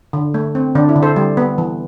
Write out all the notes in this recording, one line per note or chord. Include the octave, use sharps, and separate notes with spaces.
D3
A3
C4
D3 D4
E4
D3
A4 C5
G3
B3
E3